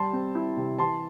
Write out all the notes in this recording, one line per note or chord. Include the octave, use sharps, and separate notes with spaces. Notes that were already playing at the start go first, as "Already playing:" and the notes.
Already playing: G3 A5 C6
C4
E4
C3
E3 A5 C6